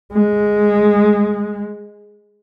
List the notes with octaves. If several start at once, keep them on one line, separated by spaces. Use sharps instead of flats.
G#3